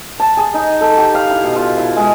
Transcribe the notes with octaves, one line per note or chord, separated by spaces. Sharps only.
A5
G#4
D#4
A4
G4
F5
E4
B2
F4
E4
G#3